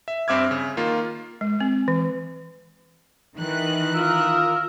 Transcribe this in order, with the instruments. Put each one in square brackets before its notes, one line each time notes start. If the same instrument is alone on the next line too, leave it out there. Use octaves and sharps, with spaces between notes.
[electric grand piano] E5
G2 C4 E5 D6 F6 G#6
C#3
D#3 A#3 F4
[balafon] G#3
C4
E3
[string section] D#3 E3 F#6
[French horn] F4 [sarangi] A#4 [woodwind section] D#6 E6